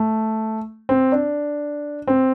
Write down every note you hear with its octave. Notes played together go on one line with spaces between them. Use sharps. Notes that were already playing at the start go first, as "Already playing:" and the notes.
Already playing: A3
C4
D4
C4